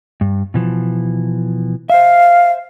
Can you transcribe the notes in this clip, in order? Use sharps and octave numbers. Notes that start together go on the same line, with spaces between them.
G2
B2 E3 F3
C5 E5 F5